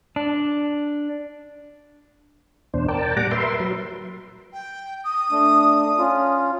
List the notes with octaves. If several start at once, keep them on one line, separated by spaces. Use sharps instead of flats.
D4
E2 B2 D4 C5
A#4 D5 G5 A5
A#2 G3 F#5 A#5 D6
A#4 B4 E5 C6
F#3
G5
D#6
A3 D4
C#4 F4